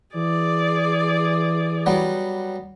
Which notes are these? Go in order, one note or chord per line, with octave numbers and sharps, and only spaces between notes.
E3 G#4 D5
F#3 G3 B3